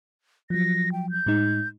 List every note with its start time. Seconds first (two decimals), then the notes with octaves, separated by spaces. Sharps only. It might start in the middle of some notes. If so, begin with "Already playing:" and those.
0.50 F3 F#3 A#6
0.92 G5
1.11 G6
1.26 A2 G#3 D#4